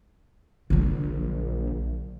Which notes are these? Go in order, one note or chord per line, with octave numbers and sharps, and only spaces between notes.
A#1 D3 F#3